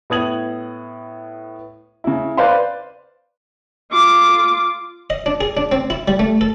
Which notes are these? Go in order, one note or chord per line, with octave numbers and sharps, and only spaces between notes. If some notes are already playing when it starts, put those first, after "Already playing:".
A2 B3 D#6 G#6 F#7
C#3 E4
B4 C5 D5 F5 B5 C6
F4 D6
D#5
D4
G#4
D4
C4
E4
G3
A3
A4